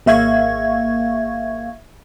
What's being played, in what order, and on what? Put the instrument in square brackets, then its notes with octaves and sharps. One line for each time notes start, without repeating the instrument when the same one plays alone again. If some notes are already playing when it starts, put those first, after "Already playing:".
[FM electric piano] G#1 A#3 E5 F5 C#6 G#6